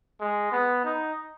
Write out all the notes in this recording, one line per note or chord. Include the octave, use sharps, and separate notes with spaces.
G#3
B3
D#4